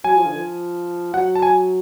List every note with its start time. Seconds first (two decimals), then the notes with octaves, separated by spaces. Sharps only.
0.04 F#3 G#5
0.15 F3
0.26 D3
0.36 F3
1.14 F#3 F#5
1.35 A5
1.42 G#5